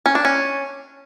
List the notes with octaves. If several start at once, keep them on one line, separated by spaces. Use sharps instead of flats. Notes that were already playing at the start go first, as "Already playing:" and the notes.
C#4
D4
C#4